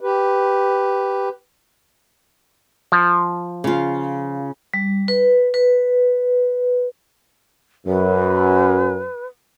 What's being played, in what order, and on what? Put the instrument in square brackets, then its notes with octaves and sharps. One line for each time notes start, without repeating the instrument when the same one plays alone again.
[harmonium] G4 B4
[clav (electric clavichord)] F3
[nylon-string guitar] C#3 F4
[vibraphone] G3
B4
B4
[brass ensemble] F#2 [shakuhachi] B4